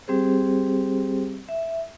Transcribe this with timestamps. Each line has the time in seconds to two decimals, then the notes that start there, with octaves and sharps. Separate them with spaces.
0.08 G3 C4 G4 G#4 C5
1.49 E5